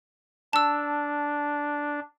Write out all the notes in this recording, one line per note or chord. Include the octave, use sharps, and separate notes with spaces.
D4 A5 E6